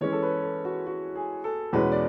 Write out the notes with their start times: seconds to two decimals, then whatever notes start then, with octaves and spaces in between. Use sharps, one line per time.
0.01 E3 G#3 C#4 C#5
0.12 A4
0.23 B4
0.43 A4
0.65 F#4
0.87 F#4
1.16 G#4
1.44 A4
1.73 E2 B2 G#3 C#4 B4
1.92 D5